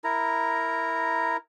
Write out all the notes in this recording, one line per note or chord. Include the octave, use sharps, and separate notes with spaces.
E4 A#4 A#5